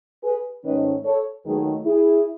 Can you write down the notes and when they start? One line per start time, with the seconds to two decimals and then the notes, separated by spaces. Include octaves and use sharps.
0.24 G#4 B4
0.64 G#2 D#3 A3 C#4 B4 D#5
1.05 A4 C#5
1.45 D#2 D#3 F#3 A3 G#4 B4
1.85 E4 G#4